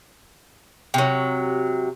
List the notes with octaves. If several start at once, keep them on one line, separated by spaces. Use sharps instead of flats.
C3 F#3